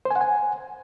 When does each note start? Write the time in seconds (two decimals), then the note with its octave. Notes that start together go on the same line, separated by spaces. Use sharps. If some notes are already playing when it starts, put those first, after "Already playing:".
0.05 C5
0.11 G#5
0.16 F#5
0.21 G#5